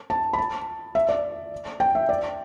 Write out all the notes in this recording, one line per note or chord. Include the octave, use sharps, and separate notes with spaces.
A5
B5
A5
E5
D5
G5
E5
D5